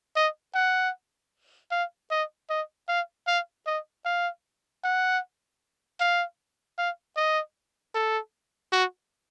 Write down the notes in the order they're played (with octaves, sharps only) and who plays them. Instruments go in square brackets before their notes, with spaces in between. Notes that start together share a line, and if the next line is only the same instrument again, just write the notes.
[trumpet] D#5
F#5
F5
D#5
D#5
F5
F5
D#5
F5
F#5
F5
F5
D#5
A4
F#4